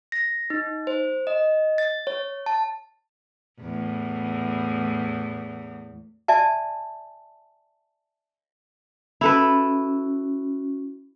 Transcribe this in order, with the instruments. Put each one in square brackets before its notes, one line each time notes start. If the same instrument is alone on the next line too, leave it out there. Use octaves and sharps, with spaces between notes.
[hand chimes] A#6
D#4
C5
D#5
A6
C#5
A5
[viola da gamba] E2 A2
[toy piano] D5 E5 G#5 A5
[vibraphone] C#4 F#4 [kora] E4 A4 B4